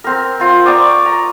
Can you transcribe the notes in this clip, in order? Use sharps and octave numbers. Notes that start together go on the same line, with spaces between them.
C4 A#4
C4 F4
D5 A#5 C#6 D#6
A#5